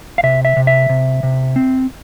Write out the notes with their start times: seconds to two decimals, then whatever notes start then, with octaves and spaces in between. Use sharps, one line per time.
0.18 F5
0.23 C3 E5
0.45 E5
0.57 C3
0.67 E5
0.89 C3
1.23 C3
1.56 C4